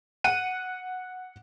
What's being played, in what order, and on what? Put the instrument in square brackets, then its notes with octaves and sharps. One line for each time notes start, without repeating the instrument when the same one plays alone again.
[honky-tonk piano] F#5 D#7